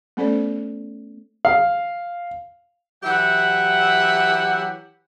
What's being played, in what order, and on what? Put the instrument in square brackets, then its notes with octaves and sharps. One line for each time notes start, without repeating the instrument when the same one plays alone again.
[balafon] A3 B3 C#4 A4 C5 D5
[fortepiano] F5
[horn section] E3 F#3 G4 E5 F#5